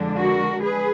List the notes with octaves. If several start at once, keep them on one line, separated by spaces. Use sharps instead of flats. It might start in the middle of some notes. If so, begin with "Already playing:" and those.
Already playing: F2 D3 G#3 D4
F#4 A#4
G#4 B4